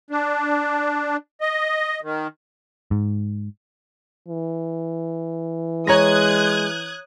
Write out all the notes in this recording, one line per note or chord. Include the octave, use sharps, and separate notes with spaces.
D4
D#5
D#3
G#2
E3
G#3 C#5 A#5 D#6 F#6 G#6 A#6